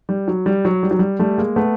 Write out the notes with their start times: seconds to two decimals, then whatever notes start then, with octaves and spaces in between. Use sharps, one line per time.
0.09 G3
0.28 F#3
0.46 G3
0.65 F#3
0.83 G3
0.91 F#3
0.99 G3
1.19 G3 A3
1.38 G#3 A#3
1.56 A3 B3